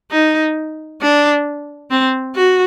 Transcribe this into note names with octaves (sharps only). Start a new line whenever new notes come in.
D#4
D4
C4
F#4